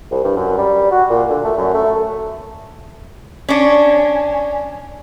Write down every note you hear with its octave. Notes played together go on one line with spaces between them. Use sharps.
C2
G2
F#2
G3
F#4
A#2
D3
A3
F#2
A3
C#4 D4